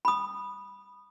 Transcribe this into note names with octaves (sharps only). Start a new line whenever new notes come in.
B5 D#6